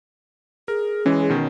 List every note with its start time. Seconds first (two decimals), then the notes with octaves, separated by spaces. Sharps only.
0.68 G#4 A#4
1.06 E3 G#3 C#4
1.30 B2 D#3